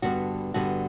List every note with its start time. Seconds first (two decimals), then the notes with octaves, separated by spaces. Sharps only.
0.02 G2 D3 G3 B3 F#4
0.54 G2 D3 G3 B3 F#4